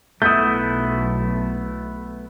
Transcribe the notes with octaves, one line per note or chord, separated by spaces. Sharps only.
B1 A3 B3 E4 D#6 G6